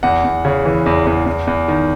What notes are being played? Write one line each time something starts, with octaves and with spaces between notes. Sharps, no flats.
E2 F#5
E2
C#3
E3
E2
E2
E2
E2
D#3